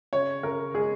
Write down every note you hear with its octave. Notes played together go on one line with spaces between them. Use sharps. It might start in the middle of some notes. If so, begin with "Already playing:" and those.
C#3 C#5
C#3 A#4
G#3 G#4